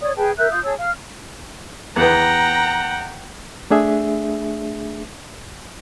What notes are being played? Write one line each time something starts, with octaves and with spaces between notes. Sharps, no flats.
C#5 D5 D#6
G#4 B4 G5 A5
A#4 E5 F#6 G6
F4 D#6 G6
G#4 C#5 A5 E6
F5 F6
E2 B3 F#5 G5 A#5
A3 D4 G#4 E5